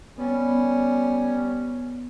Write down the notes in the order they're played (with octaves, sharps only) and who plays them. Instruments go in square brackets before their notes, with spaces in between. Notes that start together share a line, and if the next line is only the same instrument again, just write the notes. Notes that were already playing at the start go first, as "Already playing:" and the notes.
[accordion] G3 C#4 [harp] B3